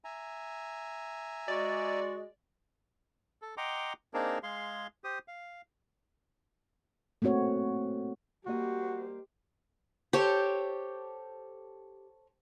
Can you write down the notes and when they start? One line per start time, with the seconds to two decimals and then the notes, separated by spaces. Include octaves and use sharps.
0.04 E5 G#5 A#5
1.48 G#3 F#4 D5
3.42 A4
3.57 D#5 F#5 G5 A#5 C6 D6
4.14 A#3 C4 D4 D#4 G#4 A#4
4.43 G#3 G#4 F5 C6
5.04 G4 C5 D#6
5.28 F5
7.22 A3 A#3 C4 F#4 C#5
8.46 G3 A#3 F#4 G4 C5 D#5
10.13 G4 A4 C5 C#5